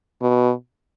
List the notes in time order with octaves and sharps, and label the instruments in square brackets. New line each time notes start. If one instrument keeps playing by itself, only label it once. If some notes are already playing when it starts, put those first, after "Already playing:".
[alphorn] B2